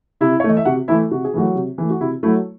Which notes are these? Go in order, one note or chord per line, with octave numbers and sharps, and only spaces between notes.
C3 E4 E5
C#5
E3 A3 D#5
E5
C3 F#4 F#5
E3 A3 E4 E5
C3 F#4
G#4
E3 F#3 A3 F#4
C3
E3 A3
F#4
C3 E4
F#3 A3 E4